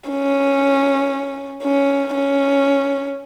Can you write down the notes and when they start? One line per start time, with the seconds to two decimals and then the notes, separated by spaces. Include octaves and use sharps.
0.10 C#4
1.63 C#4
2.14 C#4